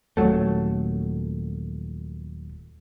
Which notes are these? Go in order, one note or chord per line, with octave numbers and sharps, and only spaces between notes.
D#1 D2 F#3 A3